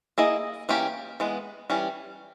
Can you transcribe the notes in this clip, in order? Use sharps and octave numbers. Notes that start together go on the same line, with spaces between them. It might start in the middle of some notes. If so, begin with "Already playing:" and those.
A#3 E4 G#4 D#5
E3 A#3 C#4 G4
E3 G#3 B3
E3 G3 C#4